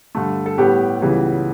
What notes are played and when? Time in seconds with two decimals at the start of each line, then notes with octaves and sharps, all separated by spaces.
0.15 G2 D3 A3
0.46 A4
0.58 A2 G3 B3 G4
1.01 C#2 C#3 E3 G3 B3